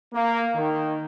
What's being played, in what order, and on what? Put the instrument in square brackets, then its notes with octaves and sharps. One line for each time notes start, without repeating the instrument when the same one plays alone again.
[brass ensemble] A#3
D#3